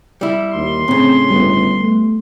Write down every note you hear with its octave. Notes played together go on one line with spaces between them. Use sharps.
G3 E4
D#2 C6
A2 C#3 C4
G1 G3 B3
A3